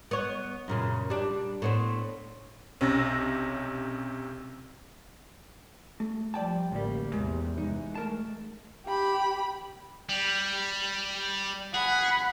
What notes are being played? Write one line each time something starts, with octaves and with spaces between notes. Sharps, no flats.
B3 C#5
F#2 A#2 C#3
G3 D4
A2 B3 C4
B1 C3 C#4 E6 A#6
A3
F3 G3 D5 G5 A5
A1 D2 G3 A#3
E2 C3 G3 G#3
E3 G#3 D#4
A3 A#4 A5
G4 B5
G3
G#4 F#5 B5